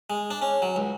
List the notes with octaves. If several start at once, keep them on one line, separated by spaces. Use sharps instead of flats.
G#3
D4
C#4
F#3
C#2